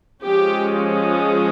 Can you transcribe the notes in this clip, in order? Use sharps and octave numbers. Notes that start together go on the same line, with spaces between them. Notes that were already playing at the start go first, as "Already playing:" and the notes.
F3 G#3 C#4 G4